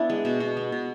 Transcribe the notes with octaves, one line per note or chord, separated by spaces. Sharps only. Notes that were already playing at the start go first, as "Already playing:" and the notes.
Already playing: B3 D4 E4
G#3
B2
B2
B3
B2